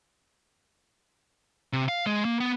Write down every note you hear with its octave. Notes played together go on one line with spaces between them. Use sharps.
C3
F5
G#3
A#3
B3